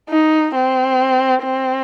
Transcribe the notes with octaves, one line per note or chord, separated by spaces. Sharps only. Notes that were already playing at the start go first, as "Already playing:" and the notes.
D#4
C4
C4